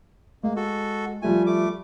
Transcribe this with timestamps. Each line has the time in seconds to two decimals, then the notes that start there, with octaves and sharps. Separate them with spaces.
0.43 G#3 A#3
0.56 F#4 A4
1.22 F3 G3 A3 F4 G#5
1.47 A3 D6